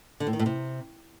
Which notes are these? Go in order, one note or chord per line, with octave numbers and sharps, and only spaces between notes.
D3
A2
D#3
A2
C3